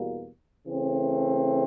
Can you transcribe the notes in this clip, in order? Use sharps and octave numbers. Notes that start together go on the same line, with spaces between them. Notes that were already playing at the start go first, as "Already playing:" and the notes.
Already playing: E2 B2 G3 A#3
C#3 E3 A3 C4